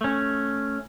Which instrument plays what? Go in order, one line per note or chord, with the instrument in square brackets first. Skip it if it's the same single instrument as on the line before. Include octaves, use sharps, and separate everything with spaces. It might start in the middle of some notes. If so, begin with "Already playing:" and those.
[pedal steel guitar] A3 C#4